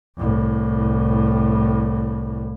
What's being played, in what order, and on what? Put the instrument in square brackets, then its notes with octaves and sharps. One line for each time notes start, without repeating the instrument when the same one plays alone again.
[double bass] C2 A2